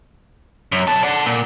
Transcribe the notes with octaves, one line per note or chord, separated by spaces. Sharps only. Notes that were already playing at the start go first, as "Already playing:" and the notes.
F#2
B2 A5
D5 F#5
A#2